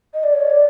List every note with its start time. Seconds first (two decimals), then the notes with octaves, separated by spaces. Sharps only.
0.13 D#5
0.23 D5
0.33 C#5
0.49 D5